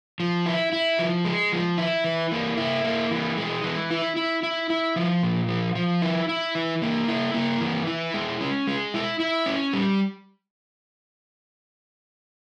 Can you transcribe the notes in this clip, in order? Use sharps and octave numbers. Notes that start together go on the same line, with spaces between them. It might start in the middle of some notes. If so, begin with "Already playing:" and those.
F3
E4
E4
F3
G#3
F3
E4
E3
A#3
E4
A#3
E3
G#3
E3
E4
E4
E4
E4
F3
A#2
F3
F3
E4
E4
E3
A#3
E4
A#3
E3
E4
G#3
C#4
G#3
E4
E4
C#4
G3